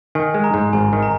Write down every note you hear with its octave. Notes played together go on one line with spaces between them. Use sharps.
D#3 G#5
G#3
A#5
G#2
G#1 G#5
D#3
A#5